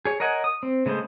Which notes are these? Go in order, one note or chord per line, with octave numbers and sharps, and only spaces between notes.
G#4 C#5
A#4 C#5 D#5 F#5 G#5
D#6
C4
C#3 G#3 A3 B3 C5